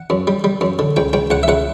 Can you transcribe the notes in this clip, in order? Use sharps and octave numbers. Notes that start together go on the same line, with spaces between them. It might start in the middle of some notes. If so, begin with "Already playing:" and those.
Already playing: F#5
F#2
G3
G3
F#2
D3
C#2 G5
C#2 G5
C#2 F#5
E5
C#2 F#5